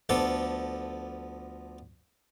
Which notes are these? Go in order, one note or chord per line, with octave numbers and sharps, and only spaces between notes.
D2 F3 B3 F4 A4 D6